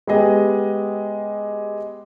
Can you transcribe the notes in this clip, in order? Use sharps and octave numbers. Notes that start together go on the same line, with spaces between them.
G#3 B3 G4 G#4 D#5